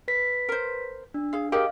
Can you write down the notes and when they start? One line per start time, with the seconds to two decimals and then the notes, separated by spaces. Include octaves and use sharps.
0.08 B4 B6
0.49 A#4 C5
1.14 D4
1.33 G#4 F5
1.52 G4 G#4 A#4 D#5 F5